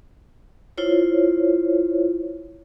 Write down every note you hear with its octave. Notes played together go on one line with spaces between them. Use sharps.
E4 F4 C5 C#5